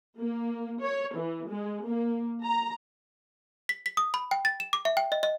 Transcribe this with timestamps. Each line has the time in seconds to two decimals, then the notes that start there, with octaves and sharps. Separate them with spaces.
0.20 A#3
0.82 C#5
1.17 E3
1.49 G#3
1.85 A#3
2.43 A#5
3.69 B6
3.86 B6
3.97 D#6
4.14 B5
4.31 G5
4.45 A6
4.60 E7
4.73 D6
4.85 E5
4.97 G5
5.12 D#5
5.23 D#5